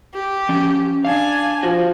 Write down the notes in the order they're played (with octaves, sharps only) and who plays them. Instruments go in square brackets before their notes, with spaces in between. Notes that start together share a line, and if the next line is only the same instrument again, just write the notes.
[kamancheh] G4
[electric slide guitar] F3 C#4
[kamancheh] D4 G#5 [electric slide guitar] F5
[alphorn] F3 [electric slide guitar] F4 F#4